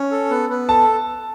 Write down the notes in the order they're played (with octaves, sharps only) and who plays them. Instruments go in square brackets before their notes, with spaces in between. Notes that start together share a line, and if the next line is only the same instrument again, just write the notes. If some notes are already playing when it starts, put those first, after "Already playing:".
Already playing: [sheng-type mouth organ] C#4
A4
B3
B3
[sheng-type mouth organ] A4 [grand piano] A5